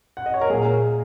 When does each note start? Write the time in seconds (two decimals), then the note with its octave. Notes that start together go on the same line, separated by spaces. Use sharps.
0.17 F#5
0.26 D#5
0.34 C#5
0.41 A#4
0.50 A#2 G#4